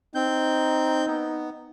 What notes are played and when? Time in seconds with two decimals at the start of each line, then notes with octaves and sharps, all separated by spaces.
0.15 C4 D#4 G6
1.07 B3